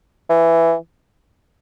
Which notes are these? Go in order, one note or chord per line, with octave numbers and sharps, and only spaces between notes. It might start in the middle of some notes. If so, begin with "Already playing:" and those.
E3